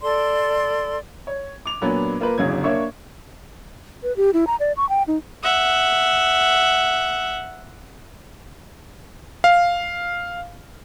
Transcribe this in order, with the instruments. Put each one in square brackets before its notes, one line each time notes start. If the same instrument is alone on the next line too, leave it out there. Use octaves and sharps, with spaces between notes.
[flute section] A4 D5 C6
[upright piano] C#5
D6 F7
A#2 F#3 A#3 B3 D4
A#3 F4 A#4 B4
G1 E2 C#3 F#3 G#6
A#3 D4 C#5 E5 C#6
[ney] B4
G4
E4
A#5
D5
C#6
G5
D#4
[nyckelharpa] E5 F#5
[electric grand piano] F5